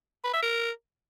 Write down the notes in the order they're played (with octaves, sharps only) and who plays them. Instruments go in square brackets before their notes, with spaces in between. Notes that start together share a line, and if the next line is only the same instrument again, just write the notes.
[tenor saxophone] B4
E5
A#4